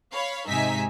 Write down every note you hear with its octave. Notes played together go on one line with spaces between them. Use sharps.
C#5 F5 B5
G#2 C3 D#4 E5 G#5 B6